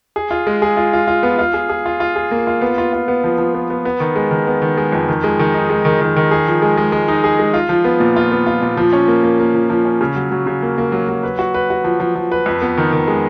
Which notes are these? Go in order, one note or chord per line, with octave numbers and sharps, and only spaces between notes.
G#4
F4
G#3
G#4
F4
F4
F4
B3
F4
G#4
G#4
F4
F4
G#4
A#3
F4
B3
F4
F4
B3
F3
F3
B3
B3
B3
D#3
G#3
D#3
B3
D#3
G#3
F2
D#3
G#3
D#3
D#4
G#3
D#3
D#3
D#3
G#4
F3
G#3
G#3
G#3
D#4
G#4
G#3
F4
F3
B3
A#2
F4
B3
F4
A#2
F3
C#4
A#3
A#3
A#3
F3
F3
C#4
C#3
F#3
F#3
C#3
A#3
A#3
F#3
F#3
B4
F#4
B4
F#4
F3
F3
F3
B4
F2
B3
D#3
D#3
G#3